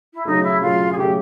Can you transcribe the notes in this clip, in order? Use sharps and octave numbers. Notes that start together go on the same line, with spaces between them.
E4
C#3 F#3 A3 D#4
E4
C#3 F#3 A3 F4
G#4
C#3 F#3 A3 G4